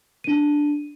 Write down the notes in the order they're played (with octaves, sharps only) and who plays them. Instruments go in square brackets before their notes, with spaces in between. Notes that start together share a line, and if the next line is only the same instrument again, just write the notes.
[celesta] D4 D#7